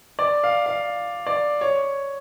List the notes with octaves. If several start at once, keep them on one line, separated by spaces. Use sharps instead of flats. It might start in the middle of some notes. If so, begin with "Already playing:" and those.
D5
F5
F5
D5
C#5